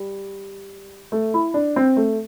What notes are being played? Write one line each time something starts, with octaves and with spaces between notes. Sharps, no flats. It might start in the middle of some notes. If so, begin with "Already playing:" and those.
Already playing: G3
A3
E4
D4
C4
A3